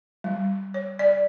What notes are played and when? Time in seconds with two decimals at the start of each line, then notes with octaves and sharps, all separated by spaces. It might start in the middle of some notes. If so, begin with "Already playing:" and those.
0.24 G3
0.74 C#5
0.99 D5